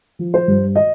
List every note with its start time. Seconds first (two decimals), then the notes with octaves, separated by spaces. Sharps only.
0.19 F3
0.34 C5
0.48 G2
0.76 D#5